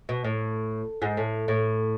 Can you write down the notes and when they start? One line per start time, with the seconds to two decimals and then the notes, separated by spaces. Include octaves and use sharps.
0.09 B2
0.25 A2
1.02 G#2
1.17 A2
1.48 A2